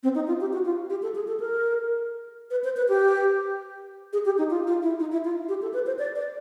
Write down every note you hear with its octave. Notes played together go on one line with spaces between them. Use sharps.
C4
D#4
F4
G4
F#4
F4
G4
A4
G#4
A4
A#4
B4
C5
B4
G4
G#4
G4
D#4
F4
F4
E4
D#4
E4
F4
G4
A4
B4
C5
D5
D5